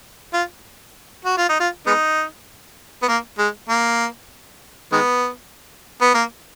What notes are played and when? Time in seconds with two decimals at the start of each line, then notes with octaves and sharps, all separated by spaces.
0.33 F4
1.25 F#4
1.37 F4
1.49 D#4
1.60 F4
1.87 G#3 B3 D#4
3.03 B3
3.08 A#3
3.38 G#3
3.69 A#3
4.92 D#3 G#3 B3
6.01 B3
6.14 A#3